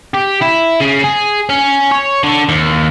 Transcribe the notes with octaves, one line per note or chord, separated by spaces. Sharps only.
G4
E4
C#3
G#4
C#4
C#5
D3
D#2